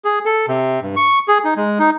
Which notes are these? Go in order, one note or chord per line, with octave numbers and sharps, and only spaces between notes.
G#4
A4
C3
G2
C#6
G#4
D#4
G#3
D#4